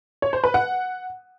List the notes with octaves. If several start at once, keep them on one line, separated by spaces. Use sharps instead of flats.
C#5
C5
B4
F#5